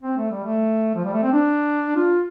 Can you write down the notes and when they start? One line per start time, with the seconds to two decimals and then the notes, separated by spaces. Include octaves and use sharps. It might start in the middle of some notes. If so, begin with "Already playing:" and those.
0.03 C4
0.17 A3
0.31 G3
0.44 A3
0.95 F3
1.04 G3
1.13 A3
1.23 C4
1.32 D4
1.96 F4